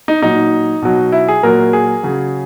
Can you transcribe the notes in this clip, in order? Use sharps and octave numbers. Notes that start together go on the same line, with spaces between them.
D#4
A#2 F#3 D#4
B2 F#3
E4
G#4
A#2 F#3 A#4
G#4
C#3 F#3